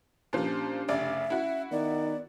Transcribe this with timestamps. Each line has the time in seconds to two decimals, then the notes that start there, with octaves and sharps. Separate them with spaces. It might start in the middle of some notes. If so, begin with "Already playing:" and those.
0.33 A#2 F3 C#4 D4 G4
0.89 F1 C#3 D5 E5
1.30 C#4 E4 F#4
1.72 D#3 B3 D5